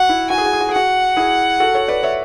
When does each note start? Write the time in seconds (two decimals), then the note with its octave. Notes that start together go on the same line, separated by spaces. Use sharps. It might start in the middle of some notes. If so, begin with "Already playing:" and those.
Already playing: F#4 F#5
0.09 E4
0.30 F#4 G#5
0.38 G#4
0.46 F#4
0.53 G#4
0.60 F#4
0.69 G#4
0.74 F#4 F#5
1.17 E4 G#4
1.60 F#4 A4
1.75 A4 C#5
1.88 B4 D5
2.03 C#5 E5